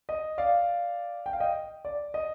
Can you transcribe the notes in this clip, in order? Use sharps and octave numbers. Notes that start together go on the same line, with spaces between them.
D#5
D5 F5
G5
F5
D#5 G5
D5
D#5